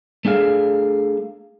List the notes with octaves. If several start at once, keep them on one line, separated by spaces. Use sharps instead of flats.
A3 D4 G#4 F5